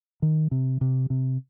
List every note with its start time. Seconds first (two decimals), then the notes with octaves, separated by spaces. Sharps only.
0.22 D#3
0.51 C3
0.81 C3
1.10 C3